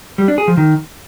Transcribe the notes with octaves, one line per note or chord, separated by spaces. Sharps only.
G3
D4
G#4
F3
D#3